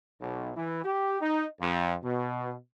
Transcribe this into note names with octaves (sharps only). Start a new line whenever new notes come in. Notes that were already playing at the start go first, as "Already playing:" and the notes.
B1
E3
G4
D#4
F2
B2